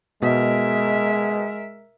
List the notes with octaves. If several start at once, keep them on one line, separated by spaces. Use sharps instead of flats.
B2 G#3 A#4 D#5 E5